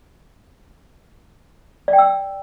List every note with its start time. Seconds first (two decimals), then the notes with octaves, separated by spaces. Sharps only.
1.88 D5
1.93 G5
1.98 E6